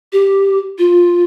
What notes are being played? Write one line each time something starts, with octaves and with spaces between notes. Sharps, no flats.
G4
F4